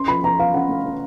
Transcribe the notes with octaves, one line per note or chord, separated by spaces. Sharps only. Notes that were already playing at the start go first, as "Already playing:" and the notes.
Already playing: C#4 C6
F3 B5
F3 A#5
F3 F5
C#4 F#5
A3
C#4